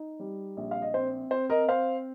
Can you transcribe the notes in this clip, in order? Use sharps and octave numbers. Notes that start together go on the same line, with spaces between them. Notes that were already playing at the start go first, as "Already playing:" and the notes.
Already playing: D#4
G3
A#1
F5
D#5
C4 C5
C4 C5
A#4 D#5
C4 C5 F5